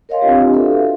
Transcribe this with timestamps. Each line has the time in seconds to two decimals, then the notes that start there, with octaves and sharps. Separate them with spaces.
0.09 A#4 C#5 D#5 F5 G#5 C6
0.22 C4 D4 F4 G4
0.53 F#4 A4 B4 E5 F5